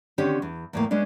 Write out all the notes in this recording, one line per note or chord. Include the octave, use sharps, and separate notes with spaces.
D3 D#3 C4 C#4 G4 C#5
E2
E2 A2 A#3
G#3 B3 C#4 D4